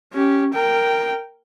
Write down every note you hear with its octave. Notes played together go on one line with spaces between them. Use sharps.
C#4 G4
A#4 G5